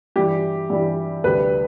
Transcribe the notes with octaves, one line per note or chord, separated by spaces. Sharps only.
G2 E3 G3 G4
G2 E3 G3
D2 C3 G3 B4